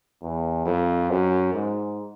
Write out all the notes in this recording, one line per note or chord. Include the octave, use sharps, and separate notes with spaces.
E2
F2
F#2
G#2